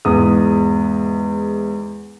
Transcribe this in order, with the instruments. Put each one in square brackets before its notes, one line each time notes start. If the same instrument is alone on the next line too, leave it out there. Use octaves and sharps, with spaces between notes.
[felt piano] E2 G#2 D#6